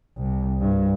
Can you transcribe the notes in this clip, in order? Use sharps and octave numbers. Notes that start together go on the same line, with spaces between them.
C2
G2